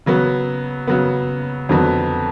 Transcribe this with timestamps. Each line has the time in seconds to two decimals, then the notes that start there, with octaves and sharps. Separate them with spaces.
0.06 C#3 F#3 B3
0.87 C#3 F#3 B3
1.69 F2 D3 F#3 B3